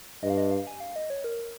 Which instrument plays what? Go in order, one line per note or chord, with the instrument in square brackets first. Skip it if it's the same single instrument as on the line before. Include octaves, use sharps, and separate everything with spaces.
[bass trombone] G2 [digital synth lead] D#5
[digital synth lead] F5
D#5
F5
G#5
F5
D#5
C#5
A#4